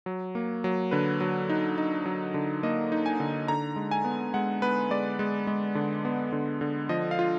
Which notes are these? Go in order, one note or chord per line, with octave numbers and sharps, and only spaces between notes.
F#3
A#3
F#3
D3 B4
F#3
D#4
D#4
F#3
D3
A#3 D#5
D#4
G#5
D3
D3 A#5
G#3
G#5
B3
G#3 F#5
B3 B4
G#3 D5
G#3
G#3
D3
B3
D3
D3
F3 D#5
F5
F4